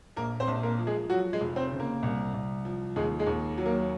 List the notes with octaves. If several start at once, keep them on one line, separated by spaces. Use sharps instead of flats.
A#1 A#3 A#4
C4 C5
A#1
A#3 A#4
F3
G#3 G#4
F3 F#3 F#4
G#3 G#4
F1
C4 C5
C#3
A#3 A#4
C2
C2
F3
D#2 G#3 G#4
G#3 G#4
D#2
F#3
A#3 A#4